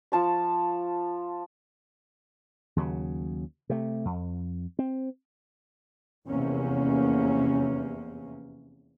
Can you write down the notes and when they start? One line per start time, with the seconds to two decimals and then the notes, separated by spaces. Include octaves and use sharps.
0.12 F3 A5 C#6
2.76 D#2 C#3 F#3
3.70 C3 A3
4.05 F2
4.79 C4
6.27 F1 E2 C3 A#3 C#4